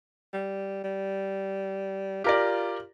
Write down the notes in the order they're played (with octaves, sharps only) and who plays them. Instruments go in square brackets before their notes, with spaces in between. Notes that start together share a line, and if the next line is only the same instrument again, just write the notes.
[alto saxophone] G3
G3
[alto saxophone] F4 [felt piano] G4 A#4 D5